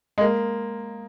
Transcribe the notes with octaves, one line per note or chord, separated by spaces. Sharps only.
G#3
A#3